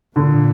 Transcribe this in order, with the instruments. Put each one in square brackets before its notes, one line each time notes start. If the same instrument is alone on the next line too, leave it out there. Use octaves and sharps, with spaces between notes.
[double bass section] A#2 [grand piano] D3